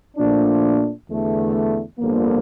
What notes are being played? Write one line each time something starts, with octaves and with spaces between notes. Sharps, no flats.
A#2 F3 A3 D4
E2 D3 A3
G1 F2 D3 F3 A#3